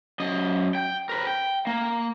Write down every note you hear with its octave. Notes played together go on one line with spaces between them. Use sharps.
F#2 D#5
G5
A#4 B4
G5
A#3